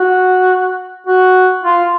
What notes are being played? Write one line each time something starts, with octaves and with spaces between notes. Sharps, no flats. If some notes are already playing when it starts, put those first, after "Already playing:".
Already playing: F#4
F#4
F4